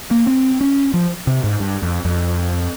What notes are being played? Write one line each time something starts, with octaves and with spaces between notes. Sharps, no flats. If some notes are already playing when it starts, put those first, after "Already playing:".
A#3
C4
C#4
F3
C3
G#2
G2
F2
F2